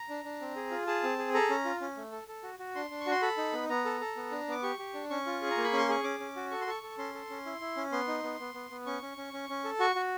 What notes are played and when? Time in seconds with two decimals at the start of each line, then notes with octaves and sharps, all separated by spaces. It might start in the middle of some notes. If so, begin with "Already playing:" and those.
Already playing: A#5
0.09 D4
0.25 D4
0.41 C4
0.56 G#4
0.71 F4
0.87 G#4 A5
1.03 C4
1.18 G#4
1.34 A4 A#5
1.50 C#4
1.65 F4
1.81 C#4
1.97 A3
2.12 A4
2.28 A4
2.43 F#4
2.59 F#4
2.75 D4 C6
2.90 D4
3.00 C#6
3.06 F#4 C6
3.22 A4 B5
3.37 D#4
3.53 B3
3.69 B3 A#5
3.85 A4
4.01 A4
4.17 B3
4.31 D4
4.48 B3 D6
4.63 G4 C#6
4.79 G4
4.94 D4
5.10 C#4 C#6
5.26 F4
5.42 G#4
5.51 A#5
5.57 A#3
5.64 B5
5.73 C#4 C6
5.89 G#4 C#6
6.04 C#4 D6
6.20 C#4
6.36 F#4
6.51 A4 C#6
6.61 C6
6.67 A4 C#6
6.83 A4
6.98 C#4 C6
7.14 A4
7.30 C#4
7.46 E4
7.61 E4
7.77 C#4
7.92 B3 C6
8.08 D#4
8.24 B3
8.40 B3
8.54 B3
8.71 B3
8.86 C#4 C#6
9.02 C#4
9.17 C#4
9.33 C#4
9.49 C#4
9.65 A4
9.80 F#4 C#6
9.96 F#4